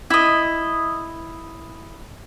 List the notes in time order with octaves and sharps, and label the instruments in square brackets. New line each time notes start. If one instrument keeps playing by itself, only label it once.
[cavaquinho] E4 D#5